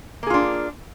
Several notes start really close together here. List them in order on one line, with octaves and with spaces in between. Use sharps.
A#3 G#4 F4 D4